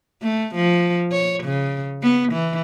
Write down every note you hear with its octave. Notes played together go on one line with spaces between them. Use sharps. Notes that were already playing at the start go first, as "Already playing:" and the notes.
A3
F3
C#5
C#3
B3
E3